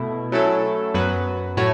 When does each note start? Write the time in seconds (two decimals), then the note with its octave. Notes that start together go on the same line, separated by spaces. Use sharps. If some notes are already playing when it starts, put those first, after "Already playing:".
Already playing: B2 A3 E4
0.32 F#3 A3 C#4 E4 A4
0.94 F#2 F#3 B3 F#4 B4
1.57 A2 A3 F#4 C#5